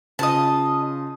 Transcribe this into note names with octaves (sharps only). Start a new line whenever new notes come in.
C#3 F4 D#5 A5 D#6